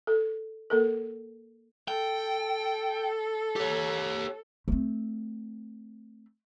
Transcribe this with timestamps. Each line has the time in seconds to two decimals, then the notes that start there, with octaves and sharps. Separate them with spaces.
0.07 A4
0.70 A#3 A4 A#4
1.88 A4 G5
3.56 G4 C#5
4.68 A3 C4